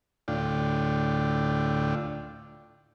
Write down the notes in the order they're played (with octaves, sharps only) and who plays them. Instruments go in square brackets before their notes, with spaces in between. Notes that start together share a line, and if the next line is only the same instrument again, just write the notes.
[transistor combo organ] D2 A2 D4 F4 G5